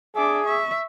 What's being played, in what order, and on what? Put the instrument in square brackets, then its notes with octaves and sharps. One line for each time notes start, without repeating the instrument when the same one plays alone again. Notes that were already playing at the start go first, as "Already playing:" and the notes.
[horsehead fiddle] D4 [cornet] G#4 [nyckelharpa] E5 D6
[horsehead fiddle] E5 [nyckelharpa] C#6